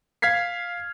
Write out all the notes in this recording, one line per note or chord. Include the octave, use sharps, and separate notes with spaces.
F5 F6 G#6 B6 C7